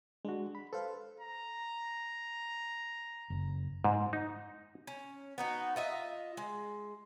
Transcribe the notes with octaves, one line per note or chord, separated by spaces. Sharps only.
G#3 D4 F#4
B5
A4 B4 C5 F5
A#5
F#1
G#2
D#4
C#4
B3 D#4 F#4
F4 D#5 E5
G#3